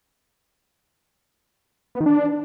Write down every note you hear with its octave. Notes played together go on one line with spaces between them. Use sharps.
B3
D#3
D4